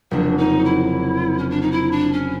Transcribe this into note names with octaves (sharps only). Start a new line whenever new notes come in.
F1 F2 C#3 F#3 A#3 D4
D#4
E4
C#4
D4
D#4
E4
D4
C#4